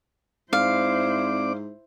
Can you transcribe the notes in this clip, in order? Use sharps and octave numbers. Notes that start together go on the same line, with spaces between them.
G#2 C4 E4 C5 D5 F5 D6